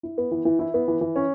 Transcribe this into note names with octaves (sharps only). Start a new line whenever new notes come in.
E4
B3
E3
E3
E4
B3
E3
E3
C#4